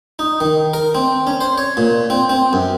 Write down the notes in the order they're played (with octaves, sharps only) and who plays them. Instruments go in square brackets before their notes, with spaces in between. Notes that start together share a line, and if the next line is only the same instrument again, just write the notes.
[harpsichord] D#4
D#3
A#4
C4
C#4
C5
C#5
A#2
C4
C4
F#2